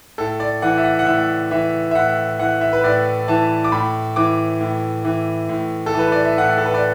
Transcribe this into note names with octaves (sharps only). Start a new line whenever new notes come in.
A2 A4
D5
E3 F#5
E5
F#5
F#5
A2 E5
E3 E5
E5
A2 F#5
E3 F#5
E5
B4
A2 D5
E3 A5
D6
A2 B5
E3 D6
A2
E3
A2
A4
E3
B4
D5
E5
A2 F#5
A4
B4
D5